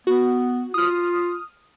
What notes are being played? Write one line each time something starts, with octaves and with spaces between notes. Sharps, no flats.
B3 F#4
F4 D#6 F6